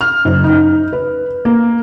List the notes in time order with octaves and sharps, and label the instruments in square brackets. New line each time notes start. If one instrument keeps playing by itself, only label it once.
[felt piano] F6
F#1
D#4
B4
A#3